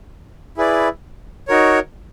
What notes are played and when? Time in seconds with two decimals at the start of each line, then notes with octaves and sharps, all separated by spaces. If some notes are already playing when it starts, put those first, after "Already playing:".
0.57 E4 G#4 B4 D5
1.48 D#4 F#4 A#4 C#5